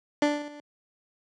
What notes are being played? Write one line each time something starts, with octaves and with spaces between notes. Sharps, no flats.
D4